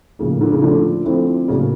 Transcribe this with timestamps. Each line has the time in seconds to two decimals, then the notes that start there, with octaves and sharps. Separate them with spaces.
0.19 A2 C#3 F3 A#3
0.41 D3
0.51 C#3
0.62 D3 F3 A3 D4
1.05 F3 A3 C4 E4
1.48 A2 C#3 F#3 A#3 D4